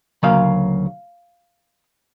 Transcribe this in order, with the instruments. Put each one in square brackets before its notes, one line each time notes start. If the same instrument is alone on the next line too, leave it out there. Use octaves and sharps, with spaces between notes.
[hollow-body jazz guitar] D2 C#3 F#3 A#3 F5